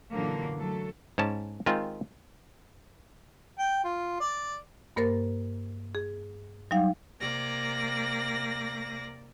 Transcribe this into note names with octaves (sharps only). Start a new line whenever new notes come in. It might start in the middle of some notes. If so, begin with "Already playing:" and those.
F#2 A#2 D3 E3 F#3 A#3
F#3 A3 A4
G#2 C#4 A5
D#3 G#3 C4 F4
G5
F4
D5
G2 A#3 A#4 C5 A6
G#4
F#3 G3 D#4 F5
C3 A#3 D5 A#6